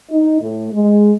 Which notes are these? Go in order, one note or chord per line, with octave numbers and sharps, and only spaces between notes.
D#4
A2
G#3